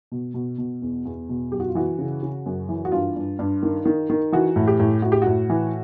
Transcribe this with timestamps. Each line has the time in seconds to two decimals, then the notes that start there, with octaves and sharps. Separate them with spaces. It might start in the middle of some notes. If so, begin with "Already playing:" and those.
0.12 B2
0.34 B2
0.58 B2
0.82 E2
1.05 E2
1.29 B2
1.52 F#2 G4
1.60 F#4
1.68 F4
1.75 E3 F#4
1.99 C#3
2.23 C#3
2.46 F#2
2.69 E3
2.85 F#4
2.92 G2 F4
3.16 G2
3.39 G2
3.63 D#3
3.85 D#3
4.10 D#3
4.32 E3 F#4
4.56 A2
4.67 G4
4.80 A2
5.02 A2 F#4
5.12 G4
5.22 A2 F#4
5.50 E3